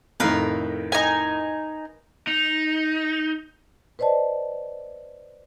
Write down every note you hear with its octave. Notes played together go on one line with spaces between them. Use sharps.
F2 A2 D#3 A#4 B4 F5
D#4 G#5
D#4
B4 C5 D5 D#5 A5